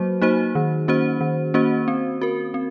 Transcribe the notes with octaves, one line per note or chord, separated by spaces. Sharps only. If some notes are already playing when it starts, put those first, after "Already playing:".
Already playing: F#3 A#3 F#4 C5
A#3 D#4 F#4 C5
D#3
A#3 C#4 F#4 C5
D#3
A#3 C#4 F#4 C5
C4
F#4 A#4
C4